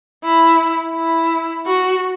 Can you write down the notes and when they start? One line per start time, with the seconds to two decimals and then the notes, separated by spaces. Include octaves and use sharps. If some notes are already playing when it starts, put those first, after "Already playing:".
0.24 E4
0.95 E4
1.67 F#4